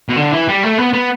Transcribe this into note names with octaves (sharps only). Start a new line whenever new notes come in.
B2
D3
E3
G3
A3
B3
B3